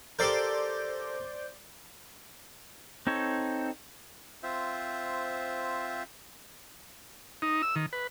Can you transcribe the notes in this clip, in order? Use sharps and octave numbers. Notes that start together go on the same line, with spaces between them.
G4 A4 A#4 C5 D5 G6
C4 D#4 A4 C#5
C4 F4 C5 E5
D#4
E6
D#3
B4